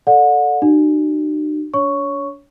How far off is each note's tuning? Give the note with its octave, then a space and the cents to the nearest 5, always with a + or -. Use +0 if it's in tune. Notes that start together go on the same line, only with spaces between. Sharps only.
A4 +0 D5 +0 F#5 -35
D#4 -45 F#4 +35
D4 -35 C#5 +5 C#6 +5